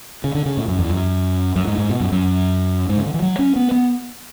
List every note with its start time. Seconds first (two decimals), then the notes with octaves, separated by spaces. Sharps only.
0.24 C#3
0.35 D3
0.46 C#3
0.57 A2
0.68 F#2
0.79 E2
0.90 F#2
1.56 F#2
1.67 G#2
1.78 G#2
1.90 B2
2.00 F#2
2.12 F#2
2.89 G#2
2.97 C#3
3.06 D3
3.14 E3
3.22 F#3
3.39 C#4
3.56 B3
3.71 B3